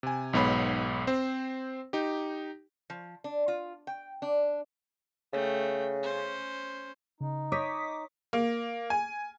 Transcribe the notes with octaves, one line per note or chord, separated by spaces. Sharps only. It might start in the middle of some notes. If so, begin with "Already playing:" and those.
C3 G#5
B1 G#2 B3 C#5 B5
C4 C5
D#4 G4
F3
D4
F4
G5
D4
C#3 A3 G5
C#4 C5
C#3 D#4
C#5 D#5 D6 D#6 G6 A#6 B6
A#3
G#5